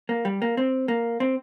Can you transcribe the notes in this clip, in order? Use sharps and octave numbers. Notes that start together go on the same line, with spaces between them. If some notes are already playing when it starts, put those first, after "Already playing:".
A#3
G3
A#3
C4
A#3
C4